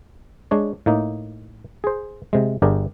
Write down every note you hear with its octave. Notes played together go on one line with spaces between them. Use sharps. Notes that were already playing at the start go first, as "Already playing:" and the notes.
G#3 D4 C#5
A2 A#3 D#4
G#4 C5
C3 G#3
G1 D4 G4 G#4 A#4 D5